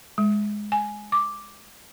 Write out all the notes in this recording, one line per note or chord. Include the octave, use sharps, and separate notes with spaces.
G#3
G#5
D6